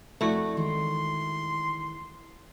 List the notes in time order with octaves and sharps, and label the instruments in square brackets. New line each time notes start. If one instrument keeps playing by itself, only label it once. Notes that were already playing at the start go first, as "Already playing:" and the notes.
[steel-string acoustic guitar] F2 D5 [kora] A3 E4 F#4
[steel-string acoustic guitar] D#3 E3 G#3 [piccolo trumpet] C6